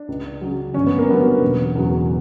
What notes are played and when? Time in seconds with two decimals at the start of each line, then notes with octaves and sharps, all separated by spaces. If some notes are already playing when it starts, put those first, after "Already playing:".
Already playing: D4
0.08 C#2
0.41 C#3 F#3
0.74 G1 C#4
0.86 B3
0.98 A#3
1.08 G2 F#3 B3
1.41 E1
1.75 E2 C#3 F#3